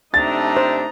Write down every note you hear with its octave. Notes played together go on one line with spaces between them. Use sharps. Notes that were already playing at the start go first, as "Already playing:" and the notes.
C3 A3 D4 D#4 A#5 A6
C5